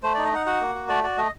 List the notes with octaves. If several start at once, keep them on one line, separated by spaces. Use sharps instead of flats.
A3 C5
D#4 D5
D#5
D#4 F#5
F#4 F#5
A#3
F#4
A3 D5
F#4 D5
A3 D#5